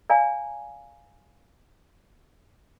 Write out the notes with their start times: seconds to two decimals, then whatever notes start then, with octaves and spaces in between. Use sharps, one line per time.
0.10 D5 F5 G#5 A#5